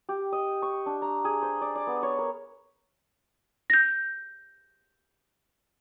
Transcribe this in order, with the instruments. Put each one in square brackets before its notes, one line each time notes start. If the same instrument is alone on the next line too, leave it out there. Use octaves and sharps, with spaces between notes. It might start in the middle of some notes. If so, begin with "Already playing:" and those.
[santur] G4
D#5
C#6
D4
A#5
G#4
C5
D5
D5
B3
C#5
A#4
[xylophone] G6 A#6